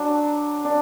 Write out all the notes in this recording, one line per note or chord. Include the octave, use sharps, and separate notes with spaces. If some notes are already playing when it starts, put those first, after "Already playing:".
Already playing: F#3 D4
D4